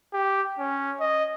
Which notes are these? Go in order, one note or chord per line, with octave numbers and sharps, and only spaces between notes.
G4
C#4
D#5